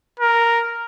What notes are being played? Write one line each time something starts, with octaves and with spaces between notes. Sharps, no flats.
A#4